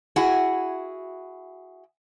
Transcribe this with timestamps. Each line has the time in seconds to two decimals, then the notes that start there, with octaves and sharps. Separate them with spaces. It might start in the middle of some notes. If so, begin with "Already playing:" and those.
0.16 E4 F#4 G#4